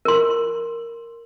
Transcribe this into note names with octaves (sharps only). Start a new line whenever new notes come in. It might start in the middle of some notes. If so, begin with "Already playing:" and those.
A#4 C6